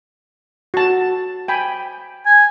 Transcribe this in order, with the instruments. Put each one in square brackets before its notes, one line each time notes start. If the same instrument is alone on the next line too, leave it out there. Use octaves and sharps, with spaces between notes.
[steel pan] F#4 A5
G5 G#5 B5
[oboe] G#5